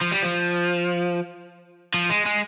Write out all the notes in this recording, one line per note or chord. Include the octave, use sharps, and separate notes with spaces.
F3
G3
F3
F3
G#3
G#3